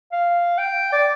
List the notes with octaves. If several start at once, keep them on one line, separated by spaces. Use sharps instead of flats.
F5
G5
D5